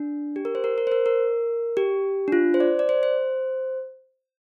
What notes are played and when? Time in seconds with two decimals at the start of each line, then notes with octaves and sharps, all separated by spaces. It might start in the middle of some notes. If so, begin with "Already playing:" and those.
Already playing: D4
0.36 G4
0.45 A#4
0.55 C5
0.64 A#4
0.78 A#4
0.87 C5
0.92 A#4
1.06 A#4
1.77 G4
2.28 D4
2.32 F4
2.54 C5
2.60 D5
2.79 D5
2.89 C5
3.03 C5